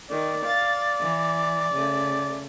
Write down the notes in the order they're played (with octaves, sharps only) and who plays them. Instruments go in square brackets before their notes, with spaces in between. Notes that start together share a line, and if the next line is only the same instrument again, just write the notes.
[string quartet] D#3 [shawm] D5
[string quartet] F5 A6
E3
C#3 A3